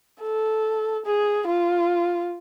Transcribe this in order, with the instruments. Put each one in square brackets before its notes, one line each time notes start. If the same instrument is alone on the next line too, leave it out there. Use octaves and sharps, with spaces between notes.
[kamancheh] A4
G#4
F4